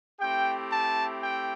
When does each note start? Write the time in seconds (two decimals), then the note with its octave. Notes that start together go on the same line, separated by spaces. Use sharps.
0.19 A3 C4 E4 G4 G5
0.70 A5
1.21 G5